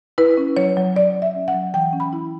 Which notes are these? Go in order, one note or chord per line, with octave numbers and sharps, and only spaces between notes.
E4 B4
C#4
F#3 C#5
F#3
F#3 D5
F#3
E5
C#4
F#5
F#3
E3 G5
C#4
B5
E4